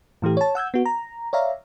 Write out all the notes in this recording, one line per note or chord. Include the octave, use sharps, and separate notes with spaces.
A2 E3 A3 G4
C#5 A5
F#5 E6 G6 G#6
B3 F#4
A#5
C#5 D5 E5 F5 A#5